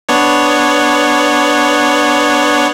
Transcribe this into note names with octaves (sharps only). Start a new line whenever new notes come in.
B3 D4 C#5